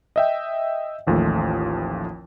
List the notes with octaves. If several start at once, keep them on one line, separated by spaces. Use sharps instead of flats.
D#5 E5 G5
A1 D#2 F3 A3